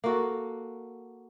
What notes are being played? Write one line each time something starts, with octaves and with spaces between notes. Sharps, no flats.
A#3 F#4 A4